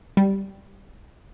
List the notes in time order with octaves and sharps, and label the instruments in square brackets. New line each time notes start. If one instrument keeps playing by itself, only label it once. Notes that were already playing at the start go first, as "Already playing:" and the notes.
[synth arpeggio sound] G3